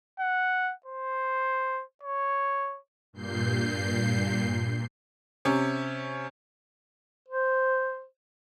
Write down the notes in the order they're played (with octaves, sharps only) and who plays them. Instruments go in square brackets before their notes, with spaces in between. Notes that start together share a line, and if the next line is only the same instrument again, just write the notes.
[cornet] F#5
C5
C#5
[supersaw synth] G2 A#2 G6 C7
[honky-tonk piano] C3 C#4
[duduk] C5